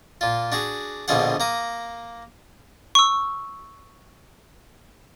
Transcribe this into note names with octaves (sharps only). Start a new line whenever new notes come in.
A#2 F4
D4 F#4 G#4
A#1 B2 D3 F4 G#4 F#5
A#3 A#5 D#6
C#6 E6